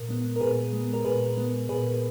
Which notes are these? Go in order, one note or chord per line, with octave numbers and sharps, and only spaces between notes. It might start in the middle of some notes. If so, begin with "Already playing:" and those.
Already playing: A#2 A#4
G#3 B3
A#4
A#2 G#4 B4
G#3 B3
A#4
A#2 G#4 B4
G#3 B3
A#2 G#4 B4